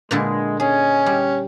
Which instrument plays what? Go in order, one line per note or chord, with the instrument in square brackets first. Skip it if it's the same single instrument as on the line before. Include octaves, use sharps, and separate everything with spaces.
[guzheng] A#2 D3 E4 [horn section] G#3
[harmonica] C#4 [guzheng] G#4 [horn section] D#5 G#5
[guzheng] G3